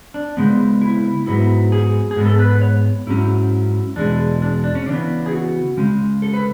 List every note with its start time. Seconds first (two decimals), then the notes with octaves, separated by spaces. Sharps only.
0.14 D4
0.37 C#3 G#3 B3
0.81 E4
1.26 G#2 F#3 B3 E4
1.72 G#4
2.11 G#4
2.16 G#2 G#3 B3
2.25 A4
2.39 B4
2.61 C#5
3.07 G#2 F#3 C#4 E4
3.96 E2 B2 G#3 D4
4.42 D4
4.64 D4
4.75 C#4
4.86 C#3 E3 B3 D4
5.26 G#4
5.32 F#4
5.77 C#3 G#3 C#4
6.22 A4
6.34 B4